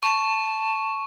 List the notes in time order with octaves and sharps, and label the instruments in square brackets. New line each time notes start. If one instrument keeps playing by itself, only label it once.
[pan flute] A5 [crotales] C#6